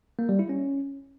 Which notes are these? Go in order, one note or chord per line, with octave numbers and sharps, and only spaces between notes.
A#3
G3
E4
C#4